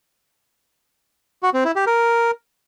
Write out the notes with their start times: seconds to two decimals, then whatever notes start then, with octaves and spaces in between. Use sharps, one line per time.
1.43 F#4
1.54 C4
1.65 E4
1.76 G4
1.87 A#4